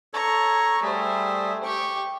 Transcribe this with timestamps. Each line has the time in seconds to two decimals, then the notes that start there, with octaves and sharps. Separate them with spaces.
0.13 A4 C#5 A#5 C#6
0.82 G3 A3 G#4 C5 E5
1.64 G4 G5 C#6